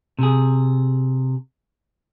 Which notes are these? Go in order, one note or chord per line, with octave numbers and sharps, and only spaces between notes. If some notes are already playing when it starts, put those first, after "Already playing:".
C3 G#4